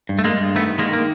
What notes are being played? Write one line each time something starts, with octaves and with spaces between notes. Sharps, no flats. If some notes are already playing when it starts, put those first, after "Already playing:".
G2
A3
G#3 A#3
G2
D#3 A3 B3
D#3 G#3 A#3
A#3